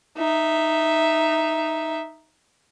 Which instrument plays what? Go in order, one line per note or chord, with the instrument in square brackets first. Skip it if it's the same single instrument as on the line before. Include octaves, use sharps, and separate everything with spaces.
[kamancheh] D#4 E5